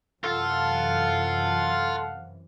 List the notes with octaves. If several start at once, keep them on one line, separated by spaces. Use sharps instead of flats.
F#2 C3 E3 F4 A4 F5 F#5